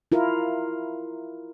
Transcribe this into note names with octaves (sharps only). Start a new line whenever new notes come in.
E4 F4 A#4